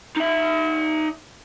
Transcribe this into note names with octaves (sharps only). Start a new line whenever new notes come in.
D#4 E5